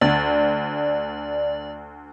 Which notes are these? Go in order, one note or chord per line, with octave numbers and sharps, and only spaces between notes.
D2 D5